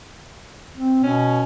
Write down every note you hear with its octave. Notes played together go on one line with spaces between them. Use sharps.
C4
B2 C#4